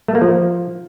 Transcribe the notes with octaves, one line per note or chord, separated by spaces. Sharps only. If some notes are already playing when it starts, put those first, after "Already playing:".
A3
A#3
F3